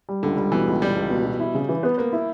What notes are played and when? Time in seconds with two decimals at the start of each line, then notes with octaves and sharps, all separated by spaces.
0.09 G3
0.23 C#2 D3
0.37 G3
0.52 B2 E3
0.67 C#2
0.82 C#2 G3
0.96 C#2
1.10 B2
1.26 B2
1.40 E4
1.54 C#3
1.69 E3
1.83 B3
1.98 A#3 B3
2.13 E4